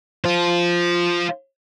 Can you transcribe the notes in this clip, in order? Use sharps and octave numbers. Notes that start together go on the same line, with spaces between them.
F4 C5